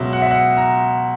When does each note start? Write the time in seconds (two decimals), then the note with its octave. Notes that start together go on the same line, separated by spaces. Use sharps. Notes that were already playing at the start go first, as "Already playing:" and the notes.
Already playing: C#2 B2 F#3 E5
0.13 F#5
0.22 E5
0.31 F#5
0.57 A#5